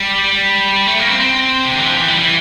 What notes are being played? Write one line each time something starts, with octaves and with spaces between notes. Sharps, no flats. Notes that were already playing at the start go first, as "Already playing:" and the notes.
Already playing: G3
A3
A#3
C4
C4
C3
D3
E3
F3
E3
G3
E3